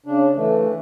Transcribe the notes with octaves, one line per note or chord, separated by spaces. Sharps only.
C#3 D4
E3 A3